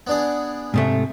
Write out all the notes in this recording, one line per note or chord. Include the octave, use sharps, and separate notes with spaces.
B3 D4 G#4
G#2 C3 A3